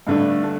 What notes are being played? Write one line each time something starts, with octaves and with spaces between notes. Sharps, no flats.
G2 D3 A3 D4
A3 D4